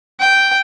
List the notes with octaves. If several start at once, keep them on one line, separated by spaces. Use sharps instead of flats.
G5